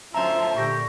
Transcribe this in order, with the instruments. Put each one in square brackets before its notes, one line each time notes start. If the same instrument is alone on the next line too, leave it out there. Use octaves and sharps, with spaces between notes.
[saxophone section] D2 C5 E5 [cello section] F#3 C#4 F4 [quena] A5 [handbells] A#5
[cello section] A#2 D3 [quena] G4 [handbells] C#6 A#6